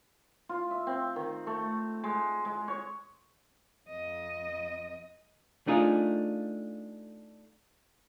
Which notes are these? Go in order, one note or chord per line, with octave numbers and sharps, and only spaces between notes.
F4
E5
C4
D#3
A3
G#3
G#3
C#5
F2 D#5
A3 D4 D#4 F4 G#4